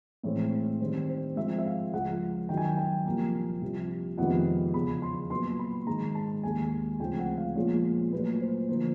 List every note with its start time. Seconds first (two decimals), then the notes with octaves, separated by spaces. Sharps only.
0.23 A2 E3 G#3 C4 C#5
0.80 G2 D#3 G3 C4 C5
1.09 C5
1.36 G#2 F3 G#3 C4 E5
1.59 E5
1.65 F5
1.94 C#2 C#3 F3 G#3 F#5
2.49 F#2 D#3 F#3 G5
2.57 G#5
2.65 G5
2.77 G5
3.06 C2 A#2 F3 A#3
3.61 C2 C3 F3
4.18 F2 C3 D#3 G#3 B3 F#5
4.74 E2 C#3 F3 B5
5.02 C6
5.30 A#2 F#3 B3 C6
5.59 B5
5.87 G#2 D#3 G#3 A#5
6.15 A5
6.43 D#2 D#3 G#3 G#5
7.00 D2 C#3 F3 G#3 C4 G5
7.19 F#5
7.38 F5
7.55 A#2 F3 G#3 B3 C#5
8.12 A#2 F#3 A3 B4
8.41 C5
8.69 D3 F3 A#3 C5